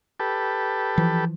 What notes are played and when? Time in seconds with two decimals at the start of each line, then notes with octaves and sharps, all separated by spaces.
0.20 G4 A4 B4
0.98 E3 F3